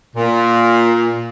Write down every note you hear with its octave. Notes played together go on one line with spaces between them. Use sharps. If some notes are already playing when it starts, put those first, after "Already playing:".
A#2